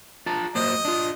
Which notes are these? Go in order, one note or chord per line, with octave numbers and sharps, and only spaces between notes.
F4 A5 A#5
F#3 A#3 C5 D#5
D4 F4